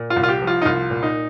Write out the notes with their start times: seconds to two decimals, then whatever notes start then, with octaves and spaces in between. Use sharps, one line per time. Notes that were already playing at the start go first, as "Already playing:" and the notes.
Already playing: A#2
0.10 F4
0.16 C2
0.23 F4
0.29 G4
0.42 F3
0.47 F4
0.62 D#4
0.65 C2 F4
0.90 A#2
1.03 D#4